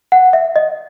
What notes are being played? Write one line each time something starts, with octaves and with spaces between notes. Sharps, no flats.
F#5
E5
D#5